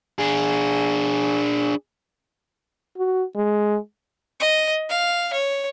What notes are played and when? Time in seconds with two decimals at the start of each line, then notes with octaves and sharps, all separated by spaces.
0.18 D4 G#4
2.98 F#4
3.36 G#3
4.40 D#5
4.89 F5
5.33 C#5